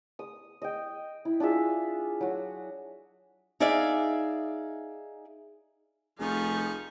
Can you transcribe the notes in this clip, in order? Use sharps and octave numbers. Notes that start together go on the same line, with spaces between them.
D#6
D#5 G5
E4
D4 F4 G#4 E5
F#3 F#4
D#4 G#4 D5 E5 F5
F1 F3 G3 D#4 G#4 F5 C#6